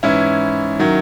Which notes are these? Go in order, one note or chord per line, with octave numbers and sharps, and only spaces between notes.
G#2 E3 C#4 E4
D#3 F#3